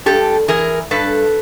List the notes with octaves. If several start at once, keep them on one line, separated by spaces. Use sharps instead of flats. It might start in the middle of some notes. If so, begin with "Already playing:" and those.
G2 G4 A4
E3 G#4 A#4
G2 A4 B4